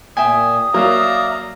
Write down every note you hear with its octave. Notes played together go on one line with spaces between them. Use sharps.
A#2 E5 G5 G#5 D#6
F#3 A#3 D5 E5 F5 A#5